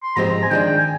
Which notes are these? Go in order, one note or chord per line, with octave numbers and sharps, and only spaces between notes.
C6
G#2 F3 G#3 C4 G4 A#5
G#5
D#3 G#3 D4 G5
G#5